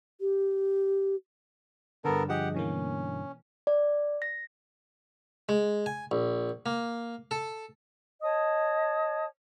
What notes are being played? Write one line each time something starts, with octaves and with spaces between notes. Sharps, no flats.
G4
G2 D3 B3 A4 A#4
F3 G4 G#4 D#5 F#5
B2 E3 A#3 C#4
D5
A#6
G#3
G#5
A#1
A#3
A4
C#5 D#5 A5 D#6